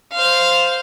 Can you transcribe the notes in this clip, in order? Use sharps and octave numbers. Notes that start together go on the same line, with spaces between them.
C5 F5